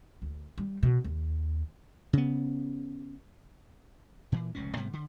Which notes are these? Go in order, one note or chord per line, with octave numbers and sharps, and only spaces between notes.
D2
G3
B2
D#2
C#3 B3
A#2 E3
F1 C#2 A#2 C#4
G#2 C3 G3 B3
D3